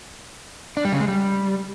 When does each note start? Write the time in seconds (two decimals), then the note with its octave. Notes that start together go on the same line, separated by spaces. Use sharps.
0.77 D4
0.85 G3
0.92 C#3
1.00 G#3
1.08 G3